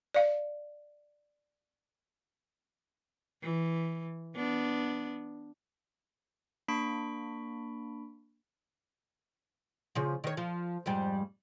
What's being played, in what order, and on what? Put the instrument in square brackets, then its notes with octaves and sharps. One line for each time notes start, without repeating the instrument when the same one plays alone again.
[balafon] D5 F5
[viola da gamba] E3
B3 D4
[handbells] A#3 D4 B5 C#6 B6 D7
[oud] C#3 F3
D#3 C#5
F3
F2 G#2 G3